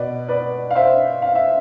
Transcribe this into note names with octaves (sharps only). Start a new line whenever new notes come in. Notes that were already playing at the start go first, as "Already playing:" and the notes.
Already playing: B2 B4 D5
B4 D5
F5
C5 E5
F5
E5